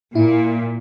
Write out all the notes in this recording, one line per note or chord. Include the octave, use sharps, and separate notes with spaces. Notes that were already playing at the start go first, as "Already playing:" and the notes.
A#2 E4